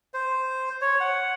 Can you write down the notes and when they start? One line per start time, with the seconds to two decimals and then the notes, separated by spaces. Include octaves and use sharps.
0.14 C5
0.81 C#5
1.00 F#5